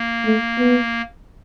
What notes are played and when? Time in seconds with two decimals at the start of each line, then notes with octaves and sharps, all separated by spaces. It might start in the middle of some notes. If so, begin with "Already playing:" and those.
Already playing: A#3
0.26 A3
0.58 B3